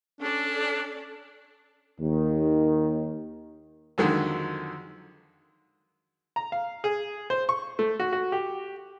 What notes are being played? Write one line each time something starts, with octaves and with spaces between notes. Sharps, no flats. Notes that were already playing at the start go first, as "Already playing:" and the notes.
C#4 D4 A4 D5
D#2 D#3
F2 D3 D#3 F#3 G#3
A#5
F5
G#4
C5
C#6
A3
F#4
F#4
G4